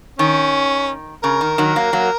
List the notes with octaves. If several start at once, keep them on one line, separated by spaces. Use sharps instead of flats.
D#3 C#4
C#3 A#4
D#3
D#3 F#3
F#3 A#3
F#3 A#3